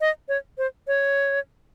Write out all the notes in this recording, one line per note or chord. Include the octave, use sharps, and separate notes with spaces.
D#5
C#5
C5
C#5